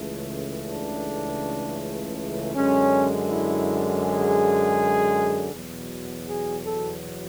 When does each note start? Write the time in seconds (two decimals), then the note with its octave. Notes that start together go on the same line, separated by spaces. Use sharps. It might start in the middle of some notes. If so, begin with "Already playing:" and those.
Already playing: C#2 C#3 E3 A3
0.68 D4
2.55 F#2 D3 G#3 C#4
3.30 E4
4.04 G#4
5.53 E2 B2 F#3
6.29 G#4
6.66 A4